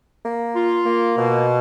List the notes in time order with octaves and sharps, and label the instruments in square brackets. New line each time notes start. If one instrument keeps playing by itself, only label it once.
[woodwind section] A#3
F4
A#3
B2